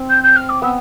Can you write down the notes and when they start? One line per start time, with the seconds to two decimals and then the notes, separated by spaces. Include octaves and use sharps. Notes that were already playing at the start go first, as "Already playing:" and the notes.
Already playing: C4
0.09 G6
0.23 G6
0.36 F6
0.49 D6
0.62 B3 E6